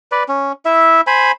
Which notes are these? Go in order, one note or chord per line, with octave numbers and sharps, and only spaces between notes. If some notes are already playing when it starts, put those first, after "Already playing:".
B4 D5
C#4
E4 E5
C5 G#5 B5